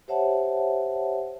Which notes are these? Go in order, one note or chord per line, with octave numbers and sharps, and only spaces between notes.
G4 C5 C#5 E5 F#5 A5